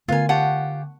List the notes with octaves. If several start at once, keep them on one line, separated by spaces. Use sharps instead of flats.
D3 A3 B3 F4 A#4 G#5
F4 G4 F#5 A5 C#6